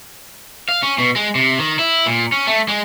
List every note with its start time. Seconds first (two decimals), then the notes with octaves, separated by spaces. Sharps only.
0.69 F5
0.83 C#4
0.98 B2
1.16 G#3
1.35 C3
1.59 D#3
1.79 E4
2.06 A#2
2.32 C#4
2.47 A3
2.68 G#3